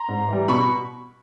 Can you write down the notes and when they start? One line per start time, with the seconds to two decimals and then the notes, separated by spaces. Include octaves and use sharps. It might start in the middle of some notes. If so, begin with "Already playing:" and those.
Already playing: A#5 C6
0.08 G#2
0.28 E3 G3
0.48 B2 B5 C#6